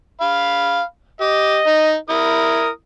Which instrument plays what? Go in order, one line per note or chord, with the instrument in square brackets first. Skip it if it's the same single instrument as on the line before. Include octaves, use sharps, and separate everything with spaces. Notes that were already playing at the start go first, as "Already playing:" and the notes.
[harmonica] F5 B5
[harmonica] G4 [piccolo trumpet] D#5
[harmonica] D#4
[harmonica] E4 D#6 [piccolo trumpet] A#4